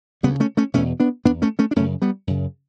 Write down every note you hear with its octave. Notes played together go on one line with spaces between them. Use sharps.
D2 C#3 G3 B3
A3 C#4
A3 C#4
E2 B2 A3 C#4
B3 D4
B2 B3 D4
E2
A3 C#4
A3 C#4
D4
F#2 C#3 A3 C#4
G3 B3
F#2 C#3